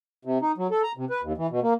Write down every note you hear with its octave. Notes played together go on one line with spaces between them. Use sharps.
C3
D#4
F#3
A4
A#5
C3
B4
D#2
E3
B2
A#3